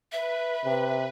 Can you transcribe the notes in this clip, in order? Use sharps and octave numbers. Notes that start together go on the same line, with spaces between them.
B4 E5
C3